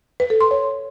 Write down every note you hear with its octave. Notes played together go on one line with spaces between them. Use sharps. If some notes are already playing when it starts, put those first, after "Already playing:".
B4
A4
C6
C#5